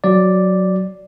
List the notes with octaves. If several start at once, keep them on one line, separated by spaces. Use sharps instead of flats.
F#3 D5